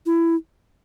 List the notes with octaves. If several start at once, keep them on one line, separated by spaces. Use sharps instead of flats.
E4